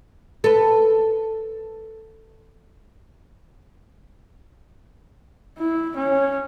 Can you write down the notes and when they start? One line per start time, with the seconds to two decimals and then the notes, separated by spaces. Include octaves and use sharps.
0.44 A4 B4
5.59 E4
5.97 C#4